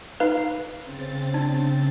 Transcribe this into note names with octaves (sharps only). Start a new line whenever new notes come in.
D#4 B4 F5
C#3 C4 A6
D4